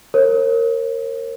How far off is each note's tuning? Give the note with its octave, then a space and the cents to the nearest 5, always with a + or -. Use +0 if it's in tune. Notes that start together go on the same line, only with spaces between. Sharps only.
A#4 -15 C#5 -40